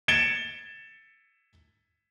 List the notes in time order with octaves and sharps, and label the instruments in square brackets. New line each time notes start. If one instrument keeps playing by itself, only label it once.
[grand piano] G#6 A6 C#7 D7 E7 G7